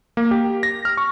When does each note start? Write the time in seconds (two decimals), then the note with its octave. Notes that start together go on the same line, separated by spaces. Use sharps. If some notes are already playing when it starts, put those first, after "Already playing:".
0.17 A#3
0.31 G4
0.63 A#6
0.85 F6
0.97 C#6